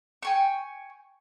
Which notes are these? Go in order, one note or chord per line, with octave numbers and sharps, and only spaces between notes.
G5 G#5 C#6